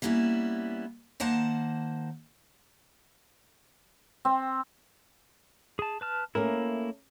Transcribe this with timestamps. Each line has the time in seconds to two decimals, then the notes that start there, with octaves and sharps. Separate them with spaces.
0.02 G3 A#3 B3 C#4 E4
1.20 D#3 A#3 C5 F#5 A5
4.25 C4
5.79 G#4 A5
6.01 B4 A5 F6
6.35 A3 A#3 C#4 E4 A#4